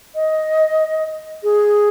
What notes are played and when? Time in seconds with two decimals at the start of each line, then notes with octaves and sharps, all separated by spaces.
0.15 D#5
1.43 G#4